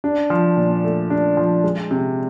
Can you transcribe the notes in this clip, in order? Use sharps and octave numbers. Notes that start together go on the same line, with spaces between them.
D4
F3
A#2
A3
D4
F3
G#3
C3